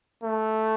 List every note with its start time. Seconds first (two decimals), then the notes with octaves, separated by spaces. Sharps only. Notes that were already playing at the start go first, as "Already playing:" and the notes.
0.23 A3